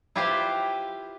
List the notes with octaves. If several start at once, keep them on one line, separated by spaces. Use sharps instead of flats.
E4 F4 G4 B4 C5 F5